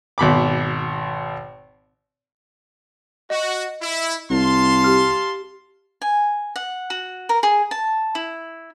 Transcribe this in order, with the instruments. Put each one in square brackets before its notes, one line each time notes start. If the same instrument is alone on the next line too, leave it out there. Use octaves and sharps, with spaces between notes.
[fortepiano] G#1 B2 B5 D6
[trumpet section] F#4 [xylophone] D#5
[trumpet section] E4
[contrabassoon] C2 [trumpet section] F5 A5 C6
[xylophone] G4 F6
[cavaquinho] G#5
F#5
F#4
A#4
G#4
A5
E4